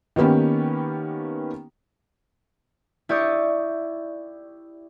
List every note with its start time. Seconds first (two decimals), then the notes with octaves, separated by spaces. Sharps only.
0.16 D#3 A#3 B3 C#4 G4
3.09 E4 G4 D5 C#6 D#6 G6